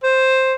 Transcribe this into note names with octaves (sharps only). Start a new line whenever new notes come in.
C5